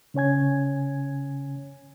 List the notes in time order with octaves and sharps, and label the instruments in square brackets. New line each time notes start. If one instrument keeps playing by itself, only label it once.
[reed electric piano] C#3 C#4 C#5 G#5 G#6